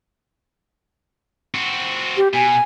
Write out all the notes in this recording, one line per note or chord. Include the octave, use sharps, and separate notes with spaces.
C4 F#4
G4
B2 G#5